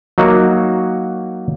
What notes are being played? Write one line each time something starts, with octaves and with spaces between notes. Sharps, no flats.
F#3 A#3 D#4 F#4